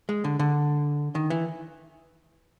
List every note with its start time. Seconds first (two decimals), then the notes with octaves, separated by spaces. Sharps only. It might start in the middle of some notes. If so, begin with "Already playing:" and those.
0.09 G#3
0.24 D3
0.39 D3
1.15 D#3
1.30 E3